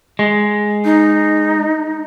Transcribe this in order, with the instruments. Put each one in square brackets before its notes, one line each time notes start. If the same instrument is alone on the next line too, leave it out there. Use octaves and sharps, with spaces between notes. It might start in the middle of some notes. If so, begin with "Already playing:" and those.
[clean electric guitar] G#3
[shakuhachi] D#4